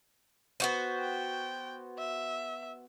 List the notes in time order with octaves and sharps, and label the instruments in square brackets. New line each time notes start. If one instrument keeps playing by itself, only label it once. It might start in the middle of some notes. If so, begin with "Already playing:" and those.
[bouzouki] B3 F#4 C5
[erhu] G5
E5